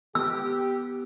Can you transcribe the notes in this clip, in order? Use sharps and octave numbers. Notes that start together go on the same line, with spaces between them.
B3 G4 E6